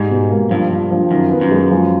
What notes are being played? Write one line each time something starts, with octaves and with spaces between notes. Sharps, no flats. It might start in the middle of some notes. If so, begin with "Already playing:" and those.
Already playing: G#2 G3
B2
A#3
G2 F3
F3
F3
F#2 D#3
B3
F#2
G#3
F3